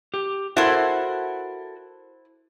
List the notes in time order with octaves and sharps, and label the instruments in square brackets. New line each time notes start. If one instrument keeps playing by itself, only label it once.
[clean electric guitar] G4
[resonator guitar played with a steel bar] E4 C5 [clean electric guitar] F#4 A4 A#4